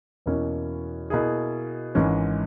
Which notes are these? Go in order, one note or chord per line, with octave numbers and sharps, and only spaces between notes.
E2 B2 A#3 C#4 E4
B2 A#3 E4 G#4
G#1 G#2 E3 G#3 C#4